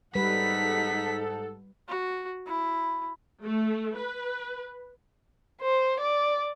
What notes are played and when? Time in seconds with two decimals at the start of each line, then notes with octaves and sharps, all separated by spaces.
0.15 G#2 G3 D#4 A4 B4 F#5 B6
1.89 F#4
2.47 E4
3.42 A3
3.96 B4
5.62 C5
6.00 D5